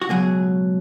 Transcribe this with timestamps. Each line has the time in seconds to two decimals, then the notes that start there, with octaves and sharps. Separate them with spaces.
0.02 F#4
0.09 C#2 B2 F#3 G#4